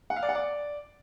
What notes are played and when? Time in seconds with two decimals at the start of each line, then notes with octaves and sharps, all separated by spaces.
0.10 F#5
0.16 F5
0.23 D5
0.29 F#5
0.35 D5